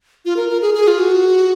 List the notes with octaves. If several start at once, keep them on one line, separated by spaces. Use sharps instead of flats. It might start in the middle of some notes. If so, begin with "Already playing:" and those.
F4
A#4
A#4
G#4
G#4
F4
F#4